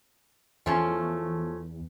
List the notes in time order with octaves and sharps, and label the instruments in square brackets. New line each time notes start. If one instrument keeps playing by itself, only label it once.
[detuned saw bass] E2 [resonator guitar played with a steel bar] F3 A3 C#4